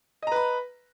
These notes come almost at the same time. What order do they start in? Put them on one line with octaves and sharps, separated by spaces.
D#5 A#5 B4 B5